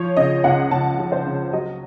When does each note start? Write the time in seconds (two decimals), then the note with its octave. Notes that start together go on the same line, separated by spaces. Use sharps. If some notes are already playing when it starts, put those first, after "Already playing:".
Already playing: F3 C#5
0.17 C#3 D#5
0.44 C#2 F#5
0.71 C#2 A5
0.99 F3
1.12 C5
1.26 C#3
1.53 F#3 D#5